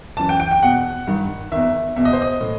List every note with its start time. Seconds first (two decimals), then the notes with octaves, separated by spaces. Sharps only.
0.17 F#2 E3 A5
0.29 G5
0.40 G5
0.51 G5
0.62 E2 B2 F#5
1.07 G2 D#3
1.52 E2 D#3 E5
1.96 E2 B2 E5
2.05 D#5
2.13 C5
2.22 D#5
2.41 A2